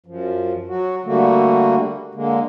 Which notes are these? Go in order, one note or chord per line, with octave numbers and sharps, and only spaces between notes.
F#2 F3
F#3 F#4
D3 G3 A3 A#3 F#4
D3 G#3 A#3